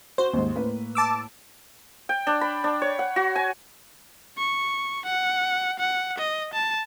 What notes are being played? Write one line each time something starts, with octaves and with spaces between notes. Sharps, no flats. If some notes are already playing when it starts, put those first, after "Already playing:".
F#4 C5
D#2 G#2
A2 A#3 B4
A5 D6 E6
G5
D4
B5
D4
C#5
F#5
F#4
G#5
C#6
F#5
F#5
D#5
A5